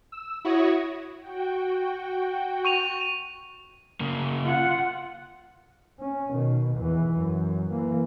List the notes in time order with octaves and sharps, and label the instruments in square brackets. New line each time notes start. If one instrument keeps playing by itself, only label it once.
[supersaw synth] E6
E4 F#4 C#5 D#6 G#6 A#6
[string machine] F#4 G5
[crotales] C#6 D#7 F7
[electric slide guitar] C#3 A#3
[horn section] F4 [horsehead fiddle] F#5
[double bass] C#4
B2 D#3
E2 E3
F#2
E3 A#3